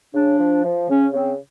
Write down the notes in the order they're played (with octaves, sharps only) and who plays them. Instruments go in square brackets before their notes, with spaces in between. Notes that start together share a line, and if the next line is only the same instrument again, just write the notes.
[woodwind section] C#3 D4
F3
F3
C#3 C#4
C#3 C4